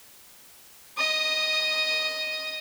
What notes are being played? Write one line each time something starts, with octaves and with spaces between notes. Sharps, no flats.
D#5 D#6